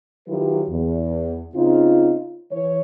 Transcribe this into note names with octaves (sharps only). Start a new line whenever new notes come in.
D#3 F#3 E4 F4 G4 B4
E2
C#3 C4 D#4 F4
E3 C#5